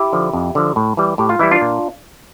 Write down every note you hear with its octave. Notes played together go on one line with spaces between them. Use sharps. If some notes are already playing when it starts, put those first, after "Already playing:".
Already playing: E4 G4
D3 F3
F2
D3 F3
A2
E3 G3
A2 G4
F4
E3 G3 E4
D4 F4
A#2